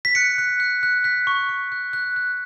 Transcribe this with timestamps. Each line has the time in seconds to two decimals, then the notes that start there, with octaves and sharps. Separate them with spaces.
0.05 B6
0.15 F#6 C#7
0.38 F#6
0.60 F#6
0.83 F#6
1.04 F#6 B6
1.27 C#6
1.49 C#6
1.72 F#6
1.93 F#6
2.16 F#6